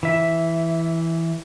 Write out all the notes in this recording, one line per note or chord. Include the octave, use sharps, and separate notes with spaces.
E3 E5